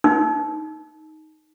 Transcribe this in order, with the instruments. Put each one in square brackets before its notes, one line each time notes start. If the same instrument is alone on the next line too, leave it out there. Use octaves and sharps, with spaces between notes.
[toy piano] D#4